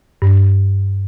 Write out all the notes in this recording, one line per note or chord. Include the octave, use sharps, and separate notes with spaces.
G2